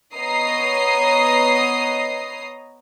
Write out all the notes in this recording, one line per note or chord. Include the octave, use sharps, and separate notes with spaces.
B3 C#5 D#5 A#5 D#6 C7